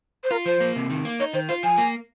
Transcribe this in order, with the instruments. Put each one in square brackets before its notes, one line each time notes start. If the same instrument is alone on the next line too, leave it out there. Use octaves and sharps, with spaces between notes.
[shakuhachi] C5
[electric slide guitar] F4 [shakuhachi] A#4
[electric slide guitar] F3 [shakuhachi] C5
[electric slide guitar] A#3
C3
D#3
A#3
[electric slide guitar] D#4 [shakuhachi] C#5
[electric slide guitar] D#3 [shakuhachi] C5
[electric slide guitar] F4 [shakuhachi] C5
[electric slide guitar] F3 [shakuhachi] G#5
[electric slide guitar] A#3